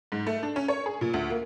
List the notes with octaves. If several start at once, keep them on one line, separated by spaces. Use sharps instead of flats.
G#2
A3
D4
C#4
C#5
G#4
A#2
D2
A#3